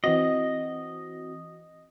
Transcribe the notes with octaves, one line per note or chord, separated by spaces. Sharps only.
E3 C4 F#4 D#5